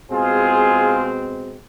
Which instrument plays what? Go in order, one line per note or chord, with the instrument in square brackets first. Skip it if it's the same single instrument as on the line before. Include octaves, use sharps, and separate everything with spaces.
[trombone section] B2 G#3 C4 [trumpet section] F4 G#4